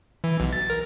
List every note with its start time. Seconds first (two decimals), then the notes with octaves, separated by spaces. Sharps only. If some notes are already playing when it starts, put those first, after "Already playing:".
0.24 E3
0.40 B1
0.53 A6
0.70 A#4